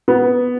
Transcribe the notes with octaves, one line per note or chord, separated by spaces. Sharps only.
B3